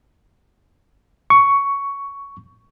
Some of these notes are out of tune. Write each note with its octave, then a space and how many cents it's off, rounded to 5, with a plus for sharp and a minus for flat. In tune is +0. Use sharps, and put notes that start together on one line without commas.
C#6 +10